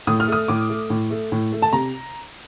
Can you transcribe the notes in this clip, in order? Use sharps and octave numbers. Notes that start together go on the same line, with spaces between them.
A2 D#6
F6
A3 D#6
A2 D6
A3
A2
A3
A2
A3
A5
C3 A#5